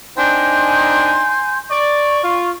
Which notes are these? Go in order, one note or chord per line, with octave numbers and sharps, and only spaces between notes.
C4 D4 D#4 G#5 C6 G6
D5 C#6
F4